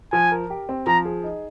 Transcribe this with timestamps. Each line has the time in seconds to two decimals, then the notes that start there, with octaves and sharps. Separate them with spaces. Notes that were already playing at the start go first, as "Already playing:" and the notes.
0.12 F3 G#5
0.31 A#4
0.50 G4
0.69 C4
0.87 F3 A#5
1.05 G#4
1.24 D#4